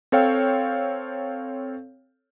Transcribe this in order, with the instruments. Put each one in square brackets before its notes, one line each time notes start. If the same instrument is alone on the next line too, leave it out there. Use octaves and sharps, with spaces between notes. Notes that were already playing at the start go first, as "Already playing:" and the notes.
[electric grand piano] C4 A4 C#5 F5 G5